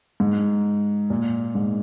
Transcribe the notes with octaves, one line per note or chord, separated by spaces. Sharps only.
G#2
A#2
G#2